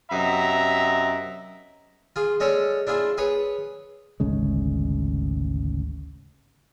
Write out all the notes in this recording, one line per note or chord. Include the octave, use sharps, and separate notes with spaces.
F#2 C3 D#5 E5 A#5
F4 G#4
G#3 C#4 A4 C#5 D5
D4 E4 F4 G#4
G#4 B4 C#5
G#1 D2 C#3 G#3